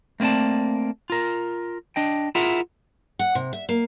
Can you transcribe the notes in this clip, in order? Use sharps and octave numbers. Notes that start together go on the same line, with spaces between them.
A3 A#3 C4 D5 A5
F4 A#4
D4 D#5 G5
E4 F4 G#4 A#4 E5 F#5
F#5
C3
E5
A#3